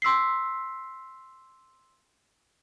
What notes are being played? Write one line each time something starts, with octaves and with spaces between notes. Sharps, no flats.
C6 E6 B6 C7